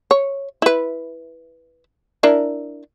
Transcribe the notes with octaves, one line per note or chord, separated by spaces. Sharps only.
C#5
E4 B4
D4 E4 A#4